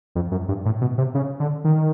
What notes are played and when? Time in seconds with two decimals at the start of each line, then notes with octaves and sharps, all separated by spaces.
0.15 F2
0.31 F#2
0.48 G2
0.65 A2
0.81 B2
0.98 C3
1.15 C#3
1.40 D3
1.64 D#3